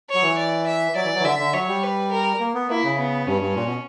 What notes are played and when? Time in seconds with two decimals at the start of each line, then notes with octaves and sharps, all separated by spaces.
0.09 C#5
0.15 F#3
0.22 E3
0.38 D5
0.67 E5
0.95 F#3 D5
1.05 E3
1.15 F#3
1.20 E3
1.24 D3 E5
1.39 D3
1.53 F#3 C#5
1.68 G3
1.83 B4
2.11 A#4
2.40 A#3
2.55 B3
2.69 A#3 E4
2.84 C#3
2.98 B3
3.27 G2 C#4
3.42 G2
3.55 A#2
3.66 B2